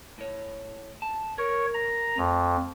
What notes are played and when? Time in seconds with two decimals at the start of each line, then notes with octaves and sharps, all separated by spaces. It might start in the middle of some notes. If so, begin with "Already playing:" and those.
0.18 A2 C#5
1.02 A5
1.38 A#4 C#5
1.74 A#5
2.18 F2 A3